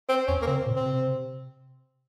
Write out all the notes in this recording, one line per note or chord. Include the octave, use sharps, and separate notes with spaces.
C4
E2 C#4
A#3
C#3 C4
A#2
C4
C3